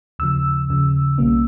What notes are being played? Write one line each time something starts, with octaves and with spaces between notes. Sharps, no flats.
D#2 C#3 F3 E6
D#2 C#3 F3
B1 B2 G3 A#3 C#4